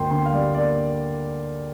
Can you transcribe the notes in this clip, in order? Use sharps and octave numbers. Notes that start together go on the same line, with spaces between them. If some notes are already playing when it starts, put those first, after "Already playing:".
Already playing: D2 A#3 G5 C6
D3 G5 C6
F5
G3 D5
A#3 D5